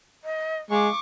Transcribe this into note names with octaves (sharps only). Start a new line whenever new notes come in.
D#5
G#3 F5 C#6 D6